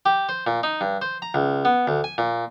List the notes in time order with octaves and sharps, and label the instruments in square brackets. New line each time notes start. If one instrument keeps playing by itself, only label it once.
[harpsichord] G4
C5
A#2
D#4
G2
C5
A#5
C#2
B3
D2
G#5
A#2